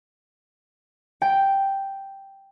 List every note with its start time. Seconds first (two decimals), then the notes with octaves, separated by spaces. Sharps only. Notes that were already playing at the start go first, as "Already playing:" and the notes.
1.22 G5